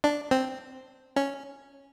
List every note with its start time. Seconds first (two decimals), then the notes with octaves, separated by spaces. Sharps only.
0.04 D4
0.31 C4
1.16 C#4